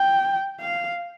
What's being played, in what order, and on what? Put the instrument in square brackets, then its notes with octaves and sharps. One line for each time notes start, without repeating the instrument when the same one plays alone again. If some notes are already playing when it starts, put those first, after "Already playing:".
Already playing: [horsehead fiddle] G5
F5